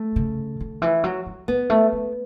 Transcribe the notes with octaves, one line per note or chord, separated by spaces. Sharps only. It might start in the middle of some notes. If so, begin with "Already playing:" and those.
Already playing: A3
C#3
D3
E3
F#3
F#3
F#3 B3
A3
A3